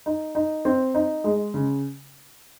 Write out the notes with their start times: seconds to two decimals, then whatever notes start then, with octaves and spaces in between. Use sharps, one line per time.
0.06 D#4
0.35 D#4
0.65 C4
0.95 D#4
1.24 G#3
1.54 C#3